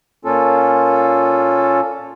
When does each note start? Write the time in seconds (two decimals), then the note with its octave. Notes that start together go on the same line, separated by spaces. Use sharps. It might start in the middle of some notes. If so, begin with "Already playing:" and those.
0.25 A#2 A#3 C#4 F4 A4